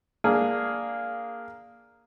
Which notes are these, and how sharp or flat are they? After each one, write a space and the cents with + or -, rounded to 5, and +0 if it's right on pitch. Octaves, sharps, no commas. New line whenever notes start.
A#3 +0 D4 +0 G#4 +0